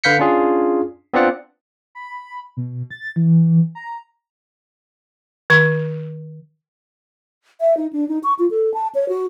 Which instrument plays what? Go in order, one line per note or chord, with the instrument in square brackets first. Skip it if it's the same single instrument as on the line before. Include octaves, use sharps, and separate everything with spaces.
[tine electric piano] D3 B4 F5 G6 B6 C#7
C#4 D4 F4 G#4
B3 C4 D4 F4 D5 F#5
[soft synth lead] B5
B2
A6
E3
A#5
[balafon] D#3 C#6
[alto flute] E5
D#4
D4
D#4
C#6
F4
A4
A5
C#5
F#4